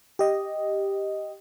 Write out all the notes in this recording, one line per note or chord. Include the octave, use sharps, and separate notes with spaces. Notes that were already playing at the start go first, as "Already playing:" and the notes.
G4 D#5